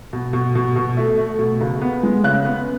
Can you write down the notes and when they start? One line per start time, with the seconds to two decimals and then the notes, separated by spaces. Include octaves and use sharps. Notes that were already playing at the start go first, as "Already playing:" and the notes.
0.13 B2
0.33 B2
0.55 B2
0.76 B2
0.97 A3
1.18 A3
1.39 B2
1.61 C#2
1.82 B3
2.03 G#3
2.24 C#3 F#6
2.45 B3